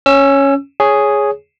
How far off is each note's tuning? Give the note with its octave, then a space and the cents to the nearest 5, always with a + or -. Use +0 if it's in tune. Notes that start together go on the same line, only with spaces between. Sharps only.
C#4 +0 E6 +25
G#4 +0 C#5 +5